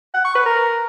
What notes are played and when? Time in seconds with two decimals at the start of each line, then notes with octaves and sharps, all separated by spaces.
0.14 F#5
0.25 C#6
0.35 B4
0.46 A#4